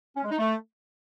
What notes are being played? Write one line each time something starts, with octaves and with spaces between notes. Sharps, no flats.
C#4
G#3
D#4
A3